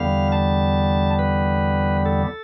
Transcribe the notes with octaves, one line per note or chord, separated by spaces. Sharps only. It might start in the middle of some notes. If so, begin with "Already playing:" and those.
Already playing: E2 D3 G3 B3 F5
A5
B4
A4